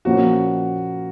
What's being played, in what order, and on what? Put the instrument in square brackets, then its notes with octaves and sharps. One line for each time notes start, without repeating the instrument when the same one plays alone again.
[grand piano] A#2 F3 A#3 C#4 [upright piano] F#4